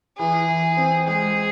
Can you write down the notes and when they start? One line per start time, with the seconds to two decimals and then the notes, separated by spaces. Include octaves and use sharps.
0.18 E3 G#4
0.49 E3
0.77 C4
1.07 G#3 G#4